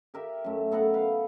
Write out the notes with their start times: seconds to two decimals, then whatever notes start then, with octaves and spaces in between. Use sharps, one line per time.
0.14 G4 A#4 E5
0.44 F#2 A3
0.72 B3 A4 A#4 F#5
0.94 B4 F5